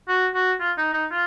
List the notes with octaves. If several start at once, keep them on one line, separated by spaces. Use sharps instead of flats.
F#4
F#4
F4
D#4
D#4
F4